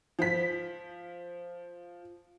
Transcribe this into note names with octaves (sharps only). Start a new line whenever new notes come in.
F3 B6